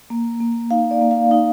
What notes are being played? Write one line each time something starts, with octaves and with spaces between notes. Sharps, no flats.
A#3
A#3
D#4 F5
D5
A#3
F5
D#4 F5